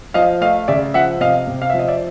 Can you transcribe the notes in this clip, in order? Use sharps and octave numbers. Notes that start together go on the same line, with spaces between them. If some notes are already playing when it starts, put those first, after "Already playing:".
F3 D#5 F5
A3 D#5 F5
C#3 D5 E5
F3 E5 F#5
C3 D#5 F5
C3
F5
E5
F3
D#5
D5 E5